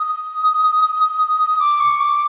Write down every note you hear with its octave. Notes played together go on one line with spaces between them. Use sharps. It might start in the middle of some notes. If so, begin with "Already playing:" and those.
Already playing: D#6
D6
C#6
D6